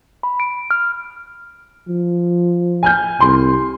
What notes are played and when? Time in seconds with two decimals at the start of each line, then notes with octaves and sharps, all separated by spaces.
0.23 B5
0.40 D7
0.71 F6
1.88 F3
2.83 G#5 F6 G6
3.20 C2 C6